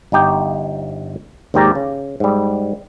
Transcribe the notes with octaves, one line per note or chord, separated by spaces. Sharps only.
G1 D#4 G4 G5
D#2 G#2 D#3 G4 D5 A#5
C#3
G#2 G3